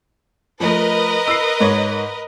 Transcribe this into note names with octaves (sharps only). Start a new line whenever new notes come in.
F3 A3 A#4 B4 D#5
E6 C7
G#2 C#5